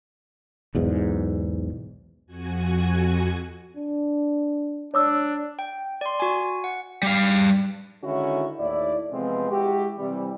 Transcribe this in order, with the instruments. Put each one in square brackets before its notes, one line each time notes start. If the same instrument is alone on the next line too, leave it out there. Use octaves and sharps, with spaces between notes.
[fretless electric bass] B1 E2 G#2
[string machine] F2 F#4 G#5
[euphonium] D4
[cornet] D4 [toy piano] C#5 D6 E6
[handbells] G5
D5 C6
F#4 G#5
F#5
[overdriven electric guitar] G3 F5
[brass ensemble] D3 D#3 G#3 C#4 E4 F#4
D#2 A2 E4 D5
C3 E3 F3 G#3 B3 C4
G#3 E4 F#4 G4
C3 E3 G3